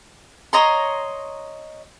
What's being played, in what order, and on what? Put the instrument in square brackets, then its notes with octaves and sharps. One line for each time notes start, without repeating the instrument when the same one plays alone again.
[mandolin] C#5 D#5 A#5 C6